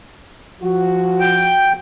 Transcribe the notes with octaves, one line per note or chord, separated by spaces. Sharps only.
F3 F#4
G5